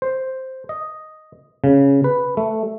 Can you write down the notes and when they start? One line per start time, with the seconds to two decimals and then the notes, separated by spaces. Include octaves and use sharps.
0.02 C5
0.69 D#5
1.64 C#3
2.04 B4
2.37 A3